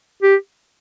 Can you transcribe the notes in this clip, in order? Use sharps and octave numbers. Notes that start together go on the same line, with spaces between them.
G4